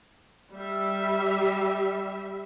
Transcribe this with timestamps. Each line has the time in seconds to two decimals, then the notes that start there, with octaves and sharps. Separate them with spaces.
0.52 G3 E5